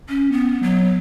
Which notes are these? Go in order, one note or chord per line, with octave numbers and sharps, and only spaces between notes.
C#4
B3
F#3